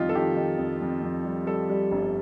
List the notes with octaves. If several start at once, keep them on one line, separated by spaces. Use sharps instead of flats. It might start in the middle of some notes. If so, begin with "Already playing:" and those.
Already playing: F2 D#3 G3 D#4 F4 G4
A4
D#3 G4
D#3
F2
F2
F2
G3
G3 A4
G3
G1